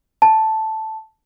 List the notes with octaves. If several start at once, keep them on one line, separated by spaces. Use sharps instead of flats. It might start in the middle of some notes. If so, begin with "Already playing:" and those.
A5